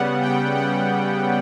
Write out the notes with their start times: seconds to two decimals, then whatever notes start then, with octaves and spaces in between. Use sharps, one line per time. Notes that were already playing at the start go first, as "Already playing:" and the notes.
Already playing: C#3 G3 B3 F#5
0.22 G5
0.56 F#5